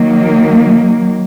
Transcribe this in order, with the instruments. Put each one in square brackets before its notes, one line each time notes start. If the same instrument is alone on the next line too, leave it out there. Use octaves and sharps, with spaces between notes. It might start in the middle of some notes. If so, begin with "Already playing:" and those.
Already playing: [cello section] D#3 F#3 A#3